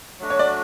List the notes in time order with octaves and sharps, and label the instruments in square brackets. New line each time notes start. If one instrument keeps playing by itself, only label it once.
[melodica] F#3 A3 D4 F#4
[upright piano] C#5
D5